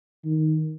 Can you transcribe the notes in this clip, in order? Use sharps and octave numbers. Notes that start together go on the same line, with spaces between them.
D#3